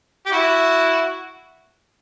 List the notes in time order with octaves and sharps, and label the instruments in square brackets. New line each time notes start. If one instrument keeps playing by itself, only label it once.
[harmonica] G4
E4 F#4